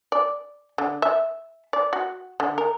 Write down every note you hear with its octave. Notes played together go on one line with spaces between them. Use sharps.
D5
D3
E5
D5
F#4
D3
A#4